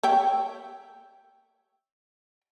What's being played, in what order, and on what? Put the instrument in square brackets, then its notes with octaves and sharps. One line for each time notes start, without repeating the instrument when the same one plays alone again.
[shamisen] C#5 E5 G5